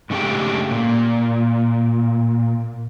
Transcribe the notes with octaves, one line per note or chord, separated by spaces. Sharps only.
G#2 C#3 A3 D4 G4 G5
A#2